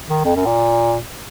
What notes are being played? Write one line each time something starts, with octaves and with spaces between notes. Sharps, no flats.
D#3
F2
F#2
A#2